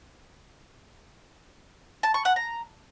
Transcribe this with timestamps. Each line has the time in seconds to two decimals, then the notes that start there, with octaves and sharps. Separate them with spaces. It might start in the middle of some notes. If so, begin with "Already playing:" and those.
2.03 A5
2.14 C#6
2.25 F#5
2.36 A#5